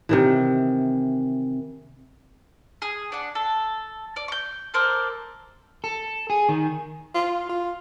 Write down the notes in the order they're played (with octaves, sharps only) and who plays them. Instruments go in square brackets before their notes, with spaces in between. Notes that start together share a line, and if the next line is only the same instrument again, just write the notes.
[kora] C3 D#3 E3
[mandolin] G#4
D4 F#5
A4
D5
C#6 G6
A4 A#4 C5 D5
[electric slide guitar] A4
G#4
D#3
[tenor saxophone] F4
F4